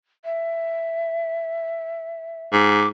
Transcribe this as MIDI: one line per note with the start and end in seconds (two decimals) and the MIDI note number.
0.25 2.46 76
2.53 2.88 44
2.53 2.88 86